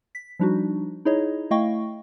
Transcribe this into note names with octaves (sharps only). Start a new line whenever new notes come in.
B6
F3 G3 D4 D#4 F#4
D#4 E4 G#4 C#5 D#5
A3 E4 D#5 F5 G5 C#6